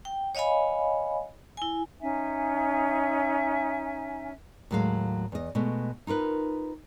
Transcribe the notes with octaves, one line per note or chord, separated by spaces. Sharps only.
G5
C#5 D#5 F5 G#5 B5
E4 G#5
C#4 D#4 E5 G#5
D#2 A2 F#3 G#3 F5
E2 D#5
B2 G#3 A3
D#4 F4 A#4 B4